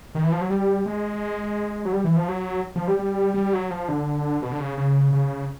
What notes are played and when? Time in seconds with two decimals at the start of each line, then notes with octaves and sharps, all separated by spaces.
0.15 D#3
0.24 E3
0.32 F3
0.41 F#3
0.50 G3
0.86 G#3
1.85 F#3
1.92 G3
2.04 E3
2.17 F3
2.28 F#3
2.76 F3
2.88 G3
2.99 G3
3.34 G3
3.53 F#3
3.71 F3
3.88 D3
4.42 B2
4.52 D3
4.59 C#3
4.77 C#3
5.13 C#3